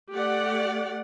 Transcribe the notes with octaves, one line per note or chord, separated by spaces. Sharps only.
A3 G4 D5 F#5